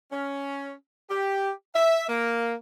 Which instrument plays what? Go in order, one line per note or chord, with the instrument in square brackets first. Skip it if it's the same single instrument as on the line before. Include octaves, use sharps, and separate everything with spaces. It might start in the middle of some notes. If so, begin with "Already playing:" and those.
[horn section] C#4
G4
E5
A#3